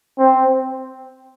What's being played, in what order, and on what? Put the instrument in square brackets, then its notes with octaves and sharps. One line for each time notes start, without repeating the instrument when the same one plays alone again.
[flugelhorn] C4